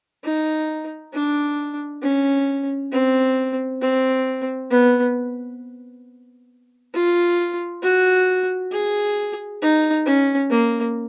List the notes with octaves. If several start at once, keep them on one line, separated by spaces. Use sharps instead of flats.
D#4
D4
C#4
C4
C4
B3
F4
F#4
G#4
D#4
C#4
A#3